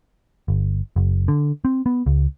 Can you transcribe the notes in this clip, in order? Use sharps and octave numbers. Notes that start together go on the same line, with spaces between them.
G1
F#1
D3
C4
B3
C#2